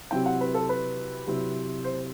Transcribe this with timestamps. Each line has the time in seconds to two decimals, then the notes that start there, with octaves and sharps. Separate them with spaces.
0.11 C3 F#3 C4 E4 G5
0.26 F#5
0.41 B4
0.54 A4
0.69 B4
1.27 C3 F#3 C4 E4
1.84 C5